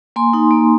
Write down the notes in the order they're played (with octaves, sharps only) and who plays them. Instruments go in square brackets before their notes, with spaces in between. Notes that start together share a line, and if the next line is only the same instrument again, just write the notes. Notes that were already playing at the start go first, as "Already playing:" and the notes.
[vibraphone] A#3 G#5 C6
D#4
A#3